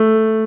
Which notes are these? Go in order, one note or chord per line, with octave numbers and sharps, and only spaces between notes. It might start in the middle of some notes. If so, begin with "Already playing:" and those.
Already playing: A3